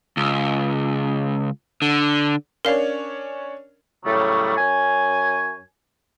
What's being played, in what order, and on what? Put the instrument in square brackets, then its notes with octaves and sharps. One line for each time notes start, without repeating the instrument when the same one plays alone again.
[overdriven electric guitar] C#2
D3
[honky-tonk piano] C#4 D4 C#5 [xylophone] A#4 F5
[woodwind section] A2 C#3 F#3 G3 A3
F#2 C#5 G#5